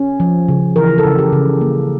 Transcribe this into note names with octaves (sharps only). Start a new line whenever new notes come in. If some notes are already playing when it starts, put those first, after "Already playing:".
Already playing: C#4
F3
C#3
E3 A#4
A4
C#3
G4
C#3
A#3